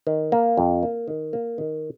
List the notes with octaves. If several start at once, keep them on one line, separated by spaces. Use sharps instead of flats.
D#3
A#3
F2
A#3
D#3
A#3
D#3